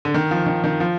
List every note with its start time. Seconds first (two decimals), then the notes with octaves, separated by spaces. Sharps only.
0.05 D3
0.14 D#3
0.31 F3
0.46 D#3
0.64 D#3
0.80 F3